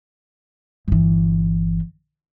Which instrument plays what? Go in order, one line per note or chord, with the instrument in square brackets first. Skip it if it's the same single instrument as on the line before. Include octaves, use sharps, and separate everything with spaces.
[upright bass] G1 E3